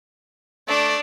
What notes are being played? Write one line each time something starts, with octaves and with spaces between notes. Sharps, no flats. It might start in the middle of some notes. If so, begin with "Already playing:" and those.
A3 D4 D5